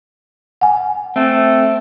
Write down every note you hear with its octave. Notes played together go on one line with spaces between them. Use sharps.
F#5 G#5
A3 C4